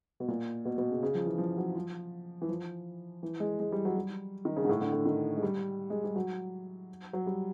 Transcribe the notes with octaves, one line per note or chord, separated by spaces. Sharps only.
B2
A#2
B2
B2
C#3
C#3
F3
E3
F3
F#3
F3
E3
F3
E3
G#3
G#3
G3
F#3
G3
D#3
C#3
G#2
A2
D3
D3
D#3
G#3
G3
G#3
G3
F#3
F#3
G3